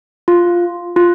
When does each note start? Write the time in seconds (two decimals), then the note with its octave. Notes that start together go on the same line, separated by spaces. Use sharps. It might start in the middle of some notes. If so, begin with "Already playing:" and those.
0.28 F4
0.96 F4